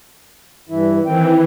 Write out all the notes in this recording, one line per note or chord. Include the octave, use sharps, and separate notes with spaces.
G2 E3 E4
D#3 E3 C4 G5